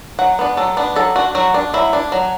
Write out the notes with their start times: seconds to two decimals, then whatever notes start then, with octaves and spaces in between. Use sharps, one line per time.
0.19 F#3 F#5
0.39 B3 D4
0.57 F#3 A4
0.77 B3 D4
0.96 F#3 A4
1.16 D4 F#4
1.35 F#3 F#4
1.54 D4
1.74 F#3 E4
1.93 D4
2.12 F#3